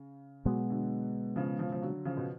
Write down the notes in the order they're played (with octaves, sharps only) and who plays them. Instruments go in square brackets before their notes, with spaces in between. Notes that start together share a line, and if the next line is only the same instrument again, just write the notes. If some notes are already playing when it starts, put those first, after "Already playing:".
Already playing: [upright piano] C#3
[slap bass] B2 G#3 B3 [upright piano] F#3
[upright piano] D3 F#3
C#3 F3
C#3 F3
F3
D3 F#3
C#3 F3
B2